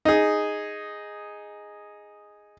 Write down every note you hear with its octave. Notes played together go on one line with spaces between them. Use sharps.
D#4 G#4